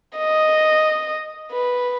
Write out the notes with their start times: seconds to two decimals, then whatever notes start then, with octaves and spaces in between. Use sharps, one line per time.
0.17 D#5
1.51 B4